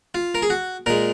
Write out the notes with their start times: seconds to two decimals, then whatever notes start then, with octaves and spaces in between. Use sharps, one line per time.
0.15 F4
0.35 A#4
0.42 G#4
0.50 F#4
0.86 A#2 G#3 A#4